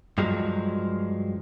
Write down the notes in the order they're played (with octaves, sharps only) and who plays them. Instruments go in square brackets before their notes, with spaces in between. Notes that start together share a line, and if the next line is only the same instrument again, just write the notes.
[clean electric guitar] G2 F3 F#3 G#3